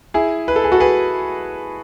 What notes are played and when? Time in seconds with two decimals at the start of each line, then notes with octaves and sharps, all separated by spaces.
0.14 E4 G#4
0.48 B4
0.56 A4
0.64 G#4
0.72 F#4 A4
0.80 G#4 B4